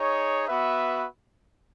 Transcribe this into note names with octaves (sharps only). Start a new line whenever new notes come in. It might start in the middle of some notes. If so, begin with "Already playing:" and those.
Already playing: D#4 G#4 C#5
B3 F#4 B4 E5